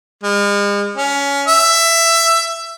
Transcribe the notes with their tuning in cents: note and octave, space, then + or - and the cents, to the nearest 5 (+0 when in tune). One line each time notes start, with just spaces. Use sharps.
G#3 -45
C#4 +20
E5 +15